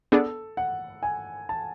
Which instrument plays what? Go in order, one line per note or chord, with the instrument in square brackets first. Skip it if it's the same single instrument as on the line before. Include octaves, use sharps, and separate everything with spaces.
[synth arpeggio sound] B3 D4 G#4 D5 [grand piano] A4
[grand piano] F#5
G#5
A5